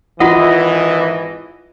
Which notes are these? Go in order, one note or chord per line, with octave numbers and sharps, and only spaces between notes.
G#1 E3 F4 F#4 D#5 F#5